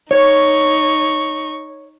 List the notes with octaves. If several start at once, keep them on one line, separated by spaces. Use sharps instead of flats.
D#4 C#5 C#6